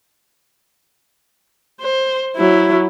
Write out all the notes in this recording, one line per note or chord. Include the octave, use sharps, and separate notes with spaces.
C5
F#3 E4